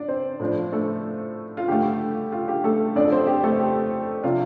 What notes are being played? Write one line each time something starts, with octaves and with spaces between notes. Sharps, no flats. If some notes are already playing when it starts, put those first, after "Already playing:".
Already playing: D4 D5
C4 C5
A2 F3 D4
A3 A4
F4
G2 D3 A3 G4
F4
G4
A3 A4
F2 D3 F3 D4 D5
A4
C4 C5
G4
A3 A4
G4
C3 F3 D4 F4